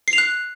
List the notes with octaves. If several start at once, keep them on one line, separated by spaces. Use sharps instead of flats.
C7
F7
F#6